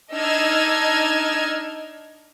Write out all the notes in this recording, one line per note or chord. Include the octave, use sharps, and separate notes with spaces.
D4 D#4 D#5 E6 F6 G#6